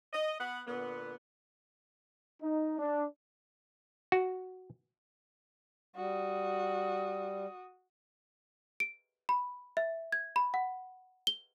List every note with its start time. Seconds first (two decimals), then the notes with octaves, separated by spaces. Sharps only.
0.13 D#5
0.39 B3 F#5
0.67 A#2 D3 B3
2.41 D#4
2.79 D4
4.12 F#4
5.96 G3 F#4 D#6
8.80 D7
9.29 B5
9.77 E5
10.12 G#6
10.36 B5
10.54 F#5
11.27 G7